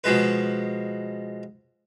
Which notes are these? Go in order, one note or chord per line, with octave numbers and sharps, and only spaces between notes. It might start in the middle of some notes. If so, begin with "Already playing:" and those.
B2 F3 G#3 B4